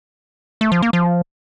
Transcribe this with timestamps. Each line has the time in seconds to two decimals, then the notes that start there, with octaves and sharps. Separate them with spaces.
0.61 A3
0.72 F3
0.82 A#3
0.93 F3